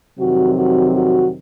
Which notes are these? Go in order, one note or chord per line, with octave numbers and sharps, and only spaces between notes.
F2 C3 D#3 F#3 F#4
F#4
F#4